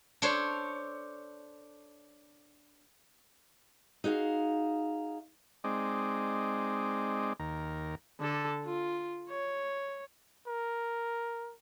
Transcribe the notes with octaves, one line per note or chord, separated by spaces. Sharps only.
D4 A4 C5 C#5
D#4 F#4 G#4 F5
G#3 C4 D#4 D5
D#2 A#4
D3 A4
F4
C#5
A#4